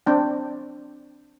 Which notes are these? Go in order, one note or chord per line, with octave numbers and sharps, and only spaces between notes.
C4 D4 G5